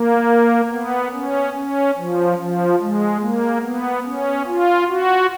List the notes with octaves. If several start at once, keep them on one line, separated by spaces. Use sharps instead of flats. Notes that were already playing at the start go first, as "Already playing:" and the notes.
Already playing: A#3
B3
C#4
C#4
F3
F3
G#3
A#3
B3
C#4
F4
F#4